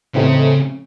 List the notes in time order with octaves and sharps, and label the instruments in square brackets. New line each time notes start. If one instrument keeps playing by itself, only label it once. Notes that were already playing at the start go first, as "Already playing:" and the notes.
[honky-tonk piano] A2 E3 A3 C4 D#4 [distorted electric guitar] C#3